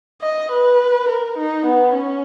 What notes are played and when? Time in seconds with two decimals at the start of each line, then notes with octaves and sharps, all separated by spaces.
0.22 D#5
0.52 B4
1.08 A#4
1.38 D#4
1.66 B3
1.94 C#4